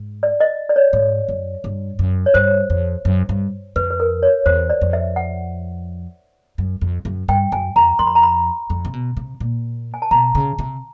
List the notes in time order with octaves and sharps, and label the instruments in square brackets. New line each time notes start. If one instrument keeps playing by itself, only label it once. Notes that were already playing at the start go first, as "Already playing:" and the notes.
Already playing: [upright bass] G#2
[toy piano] D5
D#5
D5
C#5
[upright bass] G#2
F#2
G2
F#2
[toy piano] C#5
[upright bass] G2 [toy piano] C5
[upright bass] F2
F#2
G2
[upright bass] F2 [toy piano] B4
[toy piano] B4
A#4
C#5
[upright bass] E2 [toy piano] C5
[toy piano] D5
[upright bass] F2
[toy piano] E5
F#5
[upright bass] F#2
F2
F#2
[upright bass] G2 [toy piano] G5
[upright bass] F#2 [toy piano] G#5
[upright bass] F2 [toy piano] A#5
[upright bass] F2 [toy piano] C6
[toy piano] B5
A#5
B5
[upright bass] F2
C3
B2
C3
A#2
[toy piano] G#5
A5
[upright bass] B2 [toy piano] A#5
[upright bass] C#3
C3